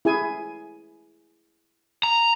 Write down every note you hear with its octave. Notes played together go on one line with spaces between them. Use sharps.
E4 G#4 G#5
A#5